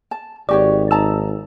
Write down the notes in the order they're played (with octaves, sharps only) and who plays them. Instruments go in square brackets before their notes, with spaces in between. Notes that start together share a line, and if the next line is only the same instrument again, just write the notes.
[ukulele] A5
[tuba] G#1 [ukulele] F#4 G4 C#5 [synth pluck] D5
[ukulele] D#4 A5 A#5 [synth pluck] E6